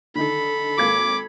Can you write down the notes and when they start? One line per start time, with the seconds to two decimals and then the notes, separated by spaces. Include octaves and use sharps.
0.15 D3 D#3 D#4 A4 B5
0.78 G#1 A#3 D6 G#6